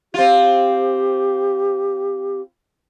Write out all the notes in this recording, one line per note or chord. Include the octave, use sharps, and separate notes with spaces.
C4 F4 G4